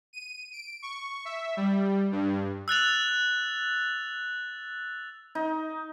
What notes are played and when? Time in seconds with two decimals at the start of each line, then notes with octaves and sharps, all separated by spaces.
0.13 D#7
0.53 D7
0.82 C#6
1.25 E5
1.57 G3
2.12 G2
2.68 E6 F#6 A6 F7
5.35 D#4